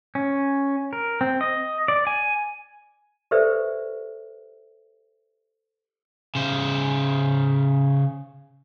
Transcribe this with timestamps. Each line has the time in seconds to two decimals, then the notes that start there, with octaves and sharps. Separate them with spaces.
0.15 C#4
0.93 A#4
1.21 C4
1.41 D#5
1.88 D5
2.07 G#5
3.31 G4 A4 B4 C5 D5 E5
6.35 C#3 C5